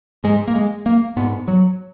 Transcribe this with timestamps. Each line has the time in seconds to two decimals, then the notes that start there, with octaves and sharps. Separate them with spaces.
0.24 G#2 G#3
0.48 A#3
0.55 G#3
0.86 A#3
1.16 G#2 B3
1.48 F#3